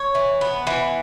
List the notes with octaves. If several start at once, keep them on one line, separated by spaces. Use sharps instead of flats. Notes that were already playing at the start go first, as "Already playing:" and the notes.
Already playing: C#5
E3
B3
E3